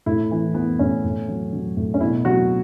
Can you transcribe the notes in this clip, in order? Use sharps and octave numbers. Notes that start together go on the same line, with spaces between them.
A2 E4
E3
E3 B3
A2 C#4
A2
F#3
F#3
A2
C#4
B2 E4
F#3 F#4